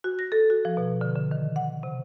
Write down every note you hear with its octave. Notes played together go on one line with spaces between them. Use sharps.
F#4
A#6
A4
F#4
F3
B2
D3
D3
D#3
F#5
C3